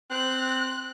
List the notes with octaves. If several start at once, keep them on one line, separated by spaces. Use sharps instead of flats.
C4 F#6